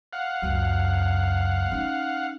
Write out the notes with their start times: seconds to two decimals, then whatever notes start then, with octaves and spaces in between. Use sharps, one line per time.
0.13 F5 F#5
0.42 C#2 F#2
1.72 C#4 D#4